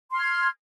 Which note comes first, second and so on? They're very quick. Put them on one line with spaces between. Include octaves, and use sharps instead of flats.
C6 F6 G#6